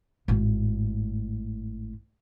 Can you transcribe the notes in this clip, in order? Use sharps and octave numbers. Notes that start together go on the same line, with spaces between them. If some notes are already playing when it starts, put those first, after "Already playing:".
G#1 A2